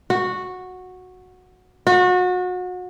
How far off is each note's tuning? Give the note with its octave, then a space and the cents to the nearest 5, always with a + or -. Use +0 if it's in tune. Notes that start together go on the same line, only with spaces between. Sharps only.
F#4 -10
F#4 -30